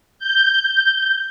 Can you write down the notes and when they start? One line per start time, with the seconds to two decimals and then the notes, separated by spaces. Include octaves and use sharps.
0.19 G6